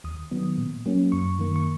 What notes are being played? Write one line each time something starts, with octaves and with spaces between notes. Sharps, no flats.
D#2 D#6
D#3 F#3 B3
A#2
F#3 A#3 C#4
F#2 C#6
D#3 A#3
C#6